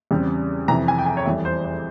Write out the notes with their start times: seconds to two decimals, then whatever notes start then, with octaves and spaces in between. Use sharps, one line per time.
0.11 E2 C#3 G3 C4
0.68 F2 C3 E3 A#5
0.88 G#5
0.99 G5
1.06 G#5
1.17 C#5
1.25 F1 E2 E3 G3 E5
1.45 C5
1.65 C5